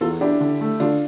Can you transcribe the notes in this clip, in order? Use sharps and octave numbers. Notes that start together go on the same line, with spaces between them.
E2 F4 A4
D4 E4 G4
D3
A3
D3 D4 F4